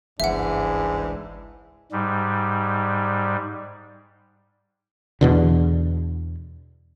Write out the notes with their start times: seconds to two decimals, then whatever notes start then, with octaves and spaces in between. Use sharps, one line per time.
0.20 G1 C#2 G#2 E3 G#3 D4 E5 F#5
1.92 G#2 G3
5.21 E2 B2 D3